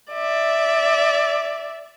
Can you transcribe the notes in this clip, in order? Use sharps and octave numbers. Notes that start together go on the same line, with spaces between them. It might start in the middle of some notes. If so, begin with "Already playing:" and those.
D5 E5